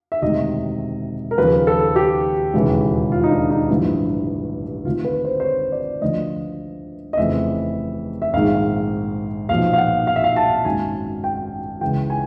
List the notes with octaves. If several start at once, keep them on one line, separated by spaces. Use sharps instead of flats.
E5
E1 D2 C3 D#3 D#5
A#4
D#2 C#3 F3 B4
A4
G4
E1 D#2 C#3 E3
F4
D#4
D4
D#4
A1 G2 D3 F3 E4
D2 C3 D#3 F4
B4
C5
C5
C#5
D5
D2 D3 F3 D#5
D#5
F1 F2 C#3 E3 E5
E5
A#1 G#2 D#3 F5
B1 A#2 F3 F5
F5
F#5
F5
E5
F5
A5
G#1 F#2 D#3 G#5
G5
C#2 C#3 E3 G5
G#5